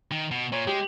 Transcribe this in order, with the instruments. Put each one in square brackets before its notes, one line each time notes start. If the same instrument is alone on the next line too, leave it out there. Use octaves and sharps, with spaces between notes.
[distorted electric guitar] D#3
B2
[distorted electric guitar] A#2 [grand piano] C#5
[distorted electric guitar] G#3 [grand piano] G4